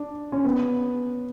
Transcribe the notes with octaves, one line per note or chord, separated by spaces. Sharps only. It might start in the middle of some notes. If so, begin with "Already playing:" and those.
Already playing: D4
C#4
B3